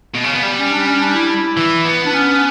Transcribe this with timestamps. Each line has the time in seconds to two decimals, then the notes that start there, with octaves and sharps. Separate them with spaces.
0.14 B2
0.24 C#3
0.34 B3
0.43 G3
0.59 C#4
0.71 D4
0.86 C#4
1.00 D4
1.14 E4
1.57 E3
1.85 B3
2.05 D4
2.14 C#4